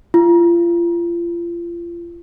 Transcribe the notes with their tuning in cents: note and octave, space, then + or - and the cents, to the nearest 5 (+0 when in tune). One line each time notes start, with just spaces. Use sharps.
F4 -30